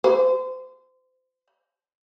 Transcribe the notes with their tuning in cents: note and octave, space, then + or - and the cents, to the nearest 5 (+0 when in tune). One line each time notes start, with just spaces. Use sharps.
C5 -30